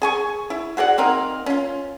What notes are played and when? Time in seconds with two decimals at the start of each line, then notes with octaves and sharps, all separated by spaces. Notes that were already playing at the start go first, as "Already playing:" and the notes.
0.02 G#4 G#5 C#6
0.50 E4
0.77 F#4 G#4 D5 F#5
0.98 A#3 C4 D#4 A#4
1.46 C#4 F4